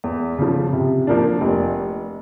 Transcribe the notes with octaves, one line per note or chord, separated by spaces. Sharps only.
E2
C#3 F3
C3
F3 A#3 D4
F1